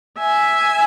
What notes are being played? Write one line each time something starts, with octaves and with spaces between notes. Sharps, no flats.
E5 G#5